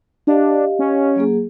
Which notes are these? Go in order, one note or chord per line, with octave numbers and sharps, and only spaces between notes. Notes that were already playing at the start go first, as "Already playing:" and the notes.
D4 G4 D#5 F5
C#4
F#3 A#3 G#4